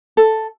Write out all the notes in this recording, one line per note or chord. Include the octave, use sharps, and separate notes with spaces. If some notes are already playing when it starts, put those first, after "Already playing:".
A4